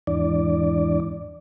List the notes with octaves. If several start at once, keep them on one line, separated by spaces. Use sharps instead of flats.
E2 G#2 E3 D4 D5